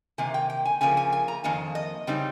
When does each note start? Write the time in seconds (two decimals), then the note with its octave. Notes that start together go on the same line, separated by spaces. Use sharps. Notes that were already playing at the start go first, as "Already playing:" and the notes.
0.18 C3 D#3 A#3 G#5
0.34 G5
0.50 G5
0.65 G#5
0.81 C#3 F3 A#3 G#5
0.97 G#5
1.13 G#5
1.28 A#5
1.44 F2 D#3 A#3 G#5
1.75 D#5
2.07 C#3 G3 C4 D#4